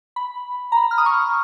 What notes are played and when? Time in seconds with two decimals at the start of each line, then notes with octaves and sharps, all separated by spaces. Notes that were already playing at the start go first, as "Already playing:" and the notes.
0.16 B5
0.72 A#5
0.77 B5
0.91 F6
0.98 D#6
1.06 C#6